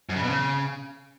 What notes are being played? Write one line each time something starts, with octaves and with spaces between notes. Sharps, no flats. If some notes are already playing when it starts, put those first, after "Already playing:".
F#2
C#3
B2
C#3